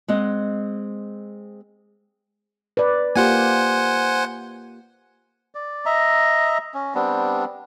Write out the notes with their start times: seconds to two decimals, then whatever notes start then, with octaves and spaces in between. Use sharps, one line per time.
0.08 G#3 C4 D#5 F#5
2.77 B4 D5
3.16 A#3 F4 G4 C5 F#5 G#5
5.55 D5
5.86 D#5 E5 A#5
6.74 C#4
6.95 G3 B3 C4 D4